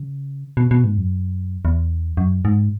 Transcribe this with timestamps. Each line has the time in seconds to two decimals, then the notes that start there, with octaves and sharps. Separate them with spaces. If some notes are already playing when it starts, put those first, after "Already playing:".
Already playing: C#3
0.57 B2
0.71 B2
0.84 G#2
0.98 F#2
1.65 E2
2.17 F#2
2.45 G#2